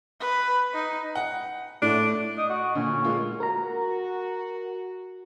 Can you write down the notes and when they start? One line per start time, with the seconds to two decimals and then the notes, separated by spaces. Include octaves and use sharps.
0.20 B4
0.73 D#4
1.15 F#5
1.82 A2 D4
2.38 D#5
2.50 F#4
2.75 A#2 D3 C#4
3.04 G#3 A#3 F4
3.40 F#4 A#4 A#5